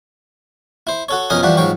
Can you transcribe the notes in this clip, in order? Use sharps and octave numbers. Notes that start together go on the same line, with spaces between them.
E4 C5
F#4 A4 C#5
F2 B2 C#4 A#4 D#5 G#5
E3 F3 G3 D4 F#4
G#2 F3 F#3 G5 C#6